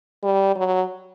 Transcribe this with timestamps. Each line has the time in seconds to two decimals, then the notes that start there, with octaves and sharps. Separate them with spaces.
0.23 G3
0.55 F#3